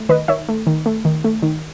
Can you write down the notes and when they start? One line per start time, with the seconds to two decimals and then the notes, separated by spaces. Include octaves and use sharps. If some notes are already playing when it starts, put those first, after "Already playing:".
Already playing: A3
0.09 D#3 B4 D#5
0.28 D#3 C#5 E5
0.48 A3
0.67 D#3
0.86 A3
1.05 D#3
1.24 A3
1.42 D#3